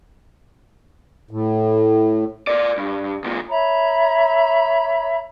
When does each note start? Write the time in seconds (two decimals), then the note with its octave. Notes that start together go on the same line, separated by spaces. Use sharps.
1.31 A2
2.47 A#4 D5
2.77 G2
3.24 C#2 A#2
3.49 C#5 E5 A#5 B5